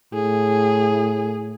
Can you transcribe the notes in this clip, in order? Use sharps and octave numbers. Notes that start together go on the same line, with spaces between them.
A2 G#4